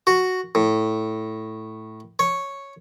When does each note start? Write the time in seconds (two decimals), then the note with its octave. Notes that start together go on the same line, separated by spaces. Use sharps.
0.07 F#4
0.55 A2
2.19 C#5